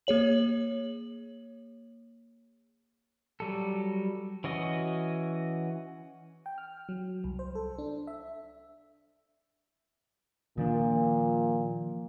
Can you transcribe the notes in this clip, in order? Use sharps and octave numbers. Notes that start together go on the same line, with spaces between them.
A#3 G#4 C#5 F#7
F#3 G3 A4
E3 C#4 F#4 D#5
G5
F6
F#3
C2
C5
A4
D4
E5
A#2 D#3 F3 D4